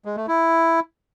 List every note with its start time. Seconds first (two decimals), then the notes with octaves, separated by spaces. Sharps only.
0.05 G#3
0.17 A3
0.28 E4